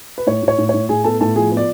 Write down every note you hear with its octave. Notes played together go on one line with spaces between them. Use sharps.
B4
A2 C#5
A2
C#5
A2
A2 C#5
A2 G#4 G#5
B3 A4 A5
A2 A4 A5
F3 G#4 G#5
B3
D5